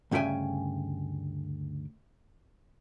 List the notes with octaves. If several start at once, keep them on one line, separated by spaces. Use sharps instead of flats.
D2 G2 C#3 E5 G5 G#5